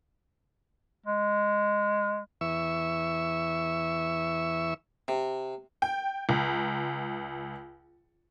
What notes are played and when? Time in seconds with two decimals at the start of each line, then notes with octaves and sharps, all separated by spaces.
1.06 G#3
2.41 E2 E3 E5 C#6 E6
5.08 C3
5.82 G5
6.29 C#2